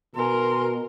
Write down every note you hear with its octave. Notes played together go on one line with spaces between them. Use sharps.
B2 A#4 G#5 C6